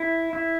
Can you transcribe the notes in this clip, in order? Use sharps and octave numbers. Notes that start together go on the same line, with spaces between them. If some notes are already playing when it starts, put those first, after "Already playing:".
Already playing: E4
E4